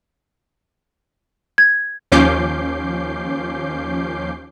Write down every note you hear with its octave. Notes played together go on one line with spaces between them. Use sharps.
G#6
D#2 F3 C#4 D6 G6 C7